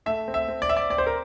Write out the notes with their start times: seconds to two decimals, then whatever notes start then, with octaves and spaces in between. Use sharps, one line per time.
0.06 A3 E5
0.28 C4
0.34 E5
0.48 C4
0.62 D5
0.69 C4 E5
0.77 D5
0.90 C4 D5
0.98 C5
1.06 A#4